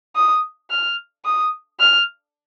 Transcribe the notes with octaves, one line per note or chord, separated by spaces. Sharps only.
D#6
F6
D#6
F6